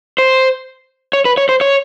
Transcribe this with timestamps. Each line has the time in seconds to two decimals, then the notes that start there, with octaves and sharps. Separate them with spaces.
0.18 C5
1.13 C#5
1.25 B4
1.37 C#5
1.49 C5
1.61 C#5